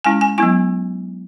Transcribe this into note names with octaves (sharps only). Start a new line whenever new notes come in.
G#3 C#4 E4 G#5
G#5
F#3 B3 E4 G#5